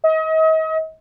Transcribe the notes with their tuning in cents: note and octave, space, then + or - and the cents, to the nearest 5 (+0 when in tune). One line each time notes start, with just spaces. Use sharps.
D#5 +35